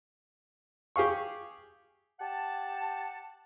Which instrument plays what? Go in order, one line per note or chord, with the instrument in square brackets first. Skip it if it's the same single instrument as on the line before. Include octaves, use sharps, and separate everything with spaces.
[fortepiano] G4 G#4 F5 C#6
[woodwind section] G4 F#5 A5